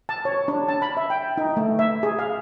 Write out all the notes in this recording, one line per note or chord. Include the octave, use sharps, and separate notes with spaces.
A5
C#5
D4
A5
B5
E5
G5
D#4
A3
E5
G#4
F5